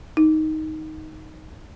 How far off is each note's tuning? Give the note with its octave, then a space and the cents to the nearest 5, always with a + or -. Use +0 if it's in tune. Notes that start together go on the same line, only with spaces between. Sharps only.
D#4 +5